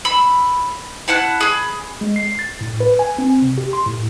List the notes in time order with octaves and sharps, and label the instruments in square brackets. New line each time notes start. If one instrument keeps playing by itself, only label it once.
[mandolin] B5 E6
E4 F#5 A5 F#6
G#4 B5
[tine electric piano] G#3
C7
A6
A2
B4
G#5
C4
C3
G4
C6
A2